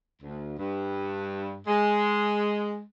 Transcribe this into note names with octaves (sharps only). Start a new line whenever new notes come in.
D2
G2
G#3